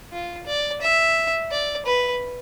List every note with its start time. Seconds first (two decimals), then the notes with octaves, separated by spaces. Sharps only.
0.12 F4
0.46 D5
0.81 E5
1.51 D5
1.86 B4